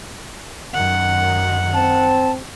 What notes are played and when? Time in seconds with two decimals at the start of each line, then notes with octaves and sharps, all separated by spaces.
0.73 F#2 D#3 F#5
1.73 C4 A5